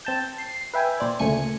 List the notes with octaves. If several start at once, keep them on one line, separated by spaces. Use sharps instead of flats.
C4 A5 G6
C7
B4 E5 G5 G#5
A#2 C5 D5
D2 A#2 C#3 A3 G#5 C#7